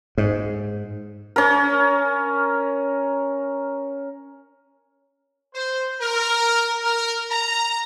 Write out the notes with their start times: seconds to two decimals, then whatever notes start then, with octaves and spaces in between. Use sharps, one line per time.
0.18 G#2
1.36 C#4 A#4
5.54 C5
6.01 A#4
6.84 A#4
7.31 A#5